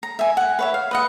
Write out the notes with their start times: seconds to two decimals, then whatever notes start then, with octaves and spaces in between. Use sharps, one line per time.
0.03 A#5
0.19 E5 G#5
0.37 F#5 G#5
0.59 B4 C#5 E5
0.74 F5
0.91 B4 D#5 F#5